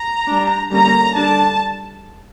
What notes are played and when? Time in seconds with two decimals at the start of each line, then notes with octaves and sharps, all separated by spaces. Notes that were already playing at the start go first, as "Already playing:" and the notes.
Already playing: A#5
0.27 G3 D4
0.71 D3 G3 A#3 C#4 A#5
1.15 D3 G3 D4 A5